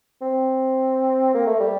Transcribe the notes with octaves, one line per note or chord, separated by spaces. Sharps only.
C4
A#3
A3
G3